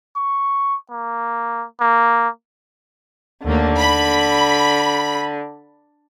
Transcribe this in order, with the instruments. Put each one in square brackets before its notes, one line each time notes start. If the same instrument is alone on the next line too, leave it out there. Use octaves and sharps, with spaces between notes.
[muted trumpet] C#6
A#3
A#3
[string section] D#2 A3 A#3 [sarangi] D3
[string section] B5